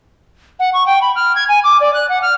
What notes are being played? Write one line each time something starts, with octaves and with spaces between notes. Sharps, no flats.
F#5
C#6
G5
B5
F6
G#6
G#5
D6
D5
F#6
F#5
F6